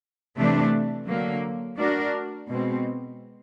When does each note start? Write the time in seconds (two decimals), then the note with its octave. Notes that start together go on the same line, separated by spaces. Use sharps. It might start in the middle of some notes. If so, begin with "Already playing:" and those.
0.37 C3 E3 A3 D4
1.07 D3 F#3 A#3
1.78 A3 D4 F#4 A#4 D5
2.49 B2 G#3 C4